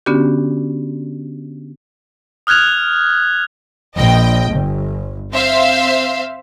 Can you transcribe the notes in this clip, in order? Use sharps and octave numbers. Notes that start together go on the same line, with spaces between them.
D3 B3 C#4 D4 F#4 G4
D#6 F6 F#6 G#6 F7
A#1 D#5 G5
G1
C4 C5 E5 F5